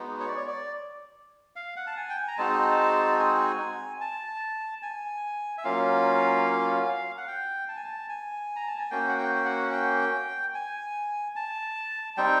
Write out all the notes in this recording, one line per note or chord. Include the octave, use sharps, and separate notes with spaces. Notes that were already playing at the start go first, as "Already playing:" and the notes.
Already playing: G#3 B3 D#4 F#4
C#5
D5
C#5
D5
F5
F#5
A5
G#5
G5
G#5
A#5
G#3 C4 D#4 F#4 A5
G#5
A5
G#5
E5
F#3 A#3 C#4 F4 F5
F#5
G5
A5
G#5
A5
G#5
A#5
A5
G#5
A#3 C#4 F#4 G5
F#5
G5
G5
F#5
G5
G#5
A5
G3 C4 D#4 G5